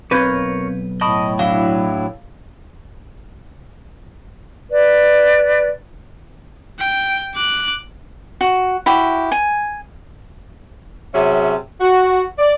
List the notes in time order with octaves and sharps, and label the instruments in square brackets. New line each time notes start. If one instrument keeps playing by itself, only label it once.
[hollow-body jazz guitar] B1 B4 [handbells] C4 G6 G#6 [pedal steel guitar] A#4 C#5
[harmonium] A2 [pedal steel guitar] D#5 D#6 [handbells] A5 B5 C#6
[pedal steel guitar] F#3 D4 E4 [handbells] F5
[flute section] B4 D5
[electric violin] G5
D6 F#6
[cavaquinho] F#4
E4 F#4 G4
G#5
[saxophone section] C3 F#3 C#4 G#4 E5
F#4
D5